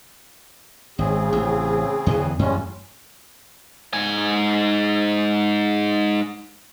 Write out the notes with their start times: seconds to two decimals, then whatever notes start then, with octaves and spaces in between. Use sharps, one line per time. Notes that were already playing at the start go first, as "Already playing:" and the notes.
0.99 G#1 C#3 C4 G#4
1.33 A1
2.06 E2 D3 E3
2.39 A1 F#2 G3 G#3 C#4
3.93 G#2 G#5